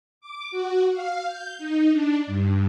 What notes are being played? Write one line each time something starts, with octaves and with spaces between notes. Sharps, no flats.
D6
F#4
F5
G6
D#4
D4
G2